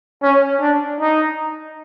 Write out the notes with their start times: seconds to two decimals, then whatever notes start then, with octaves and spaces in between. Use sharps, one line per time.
0.22 C#4
0.60 D4
1.00 D#4